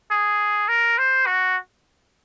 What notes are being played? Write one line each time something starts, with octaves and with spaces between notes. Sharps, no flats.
G#4
A#4
C5
F#4